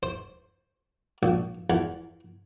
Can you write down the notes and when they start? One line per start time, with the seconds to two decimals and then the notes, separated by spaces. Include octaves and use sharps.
0.03 C5
1.23 A#1
1.70 E2